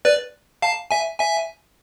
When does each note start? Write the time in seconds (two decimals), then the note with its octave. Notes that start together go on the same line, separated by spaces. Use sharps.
0.05 B4 D5
0.62 F5 A5
0.91 E5 G#5
1.19 E5 G#5